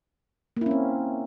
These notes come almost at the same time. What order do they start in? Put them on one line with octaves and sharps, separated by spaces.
A#3 E4 C#4 C4